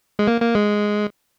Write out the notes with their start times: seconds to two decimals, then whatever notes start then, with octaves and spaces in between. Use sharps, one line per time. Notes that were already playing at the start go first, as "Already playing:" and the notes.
0.19 G#3
0.28 A#3
0.42 A#3
0.55 G#3